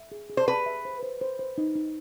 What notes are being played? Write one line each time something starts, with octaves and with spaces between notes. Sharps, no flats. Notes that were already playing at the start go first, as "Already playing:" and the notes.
Already playing: E5
G#4
G#4
C5
G#4 B4
E5
C5
C5
C5
C5
D#4
D#4